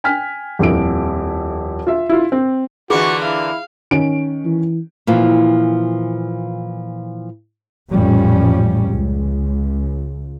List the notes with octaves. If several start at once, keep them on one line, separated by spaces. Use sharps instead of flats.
G5 G#5 F6 B6
D#1 F2 E4 D7
F4 E5
E4 F4
C4
D3 E3 A#3 F4 F#4 G#4 C#6
E4 F5
D#3 C#4 D7
E3
A#2 E3 F3 F4
A1 F2 A#2 F3 G3 C#4
C#2